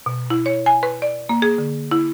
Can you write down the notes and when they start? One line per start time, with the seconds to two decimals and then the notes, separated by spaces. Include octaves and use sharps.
0.06 B2
0.30 E4
0.46 C#5
0.66 G#5
0.83 B4
1.02 D5
1.29 A#3
1.42 G#4
1.58 D3
1.91 E4